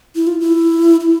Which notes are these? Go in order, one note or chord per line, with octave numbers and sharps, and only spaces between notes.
E4
F4
E4
E4